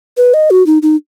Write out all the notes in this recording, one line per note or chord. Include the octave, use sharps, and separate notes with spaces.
B4
D#5
F#4
D#4
D#4